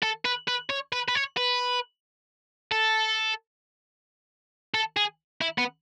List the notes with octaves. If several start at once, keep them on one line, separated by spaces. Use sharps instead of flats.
A4
B4
B4
C#5
B4
B4
C#5
B4
A4
A4
G#4
E4
B3